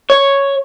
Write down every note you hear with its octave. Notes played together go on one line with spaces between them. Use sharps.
C#5